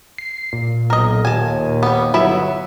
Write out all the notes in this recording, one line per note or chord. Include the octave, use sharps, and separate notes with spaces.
C7
A#2
B1 A#4 D#5
D#2 G#5 A5
G3 B3
G1 F#3 B3 E4 E5